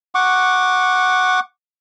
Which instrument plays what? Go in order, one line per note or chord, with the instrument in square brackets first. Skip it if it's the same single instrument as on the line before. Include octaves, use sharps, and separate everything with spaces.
[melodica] F#5 C#6 D6